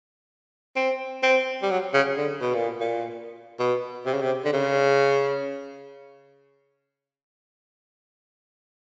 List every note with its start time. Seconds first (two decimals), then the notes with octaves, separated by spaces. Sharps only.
0.76 C4
1.23 C4
1.62 G3
1.70 F#3
1.94 C#3
2.17 D3
2.41 B2
2.54 A#2
2.81 A#2
3.59 B2
4.06 C3
4.13 C#3
4.21 C3
4.45 D3
4.53 C#3